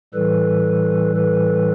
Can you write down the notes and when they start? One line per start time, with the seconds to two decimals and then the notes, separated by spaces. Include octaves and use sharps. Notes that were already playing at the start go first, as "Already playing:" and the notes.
0.14 A2 E3 G3 A4 B4
1.15 A4 B4